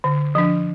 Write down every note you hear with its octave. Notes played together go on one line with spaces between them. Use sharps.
D3
F3 D4